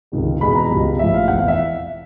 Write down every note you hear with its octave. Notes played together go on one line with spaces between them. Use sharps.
C#2 C3 D#3 G3
E2 B2 G#3 B3 B5
A#5
C#2 B2 G3 B3
A#1 A2 F3 E5
F5
F1 E2 B2 F#5
F5
E5